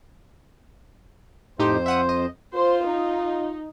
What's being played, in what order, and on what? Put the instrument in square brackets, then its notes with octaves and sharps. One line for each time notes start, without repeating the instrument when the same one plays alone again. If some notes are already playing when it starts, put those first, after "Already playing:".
[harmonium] F2 C5 [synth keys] A2 D#4 G4
[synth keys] E5 F#5 D#6
D#5
[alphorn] F4 [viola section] C5
[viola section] D#4